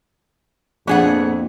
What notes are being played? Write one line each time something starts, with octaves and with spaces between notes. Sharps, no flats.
F2 A#2 F3 B3 D4 G#4 F#5